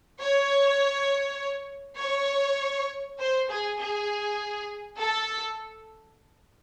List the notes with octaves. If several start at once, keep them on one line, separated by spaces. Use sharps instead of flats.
C#5
C#5
C5
G#4
G#4
A4